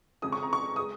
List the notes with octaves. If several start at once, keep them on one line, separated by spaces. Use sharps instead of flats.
F2 C#3 G#3 D#6
C#6
A#5
C#6
G#3 D#6